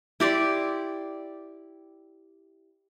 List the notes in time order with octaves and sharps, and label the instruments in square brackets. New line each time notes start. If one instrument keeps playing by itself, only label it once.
[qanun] E4 G4 D5 C6